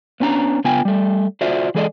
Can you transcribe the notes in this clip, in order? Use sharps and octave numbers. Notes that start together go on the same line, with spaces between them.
B3 C#4 D4 G#5 A#5
C#3 B3 F4 G5 G#5
G3 A3
F4 F#4 C5 D5 E5
E3 G#3 G#4 A4 D5 D#5